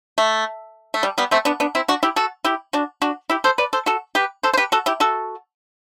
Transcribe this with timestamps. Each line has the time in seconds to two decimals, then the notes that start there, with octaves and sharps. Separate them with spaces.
0.18 A3
0.94 A3
1.03 G3
1.18 G3 B3
1.31 A3 C4
1.45 B3 D4
1.60 B3 D4
1.75 C4 E4
1.88 D4 F#4
2.03 E4 G4
2.16 F#4 A4
2.44 E4 G4
2.73 D4 F#4
3.02 D4 F#4
3.30 E4 G4
3.44 A4 C5
3.58 B4 D5
3.73 A4 C5
3.86 F#4 A4
4.15 G4 B4
4.43 A4 C5
4.53 C5
4.57 G4 B4
4.72 F#4 A4
4.86 E4 G4
5.00 F#4 A4